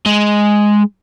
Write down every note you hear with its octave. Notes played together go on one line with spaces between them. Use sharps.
G#3